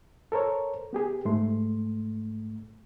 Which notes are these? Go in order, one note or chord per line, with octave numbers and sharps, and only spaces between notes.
A4 A#4 C5 C#5
B3 G4 G#4
G#2 A3 C6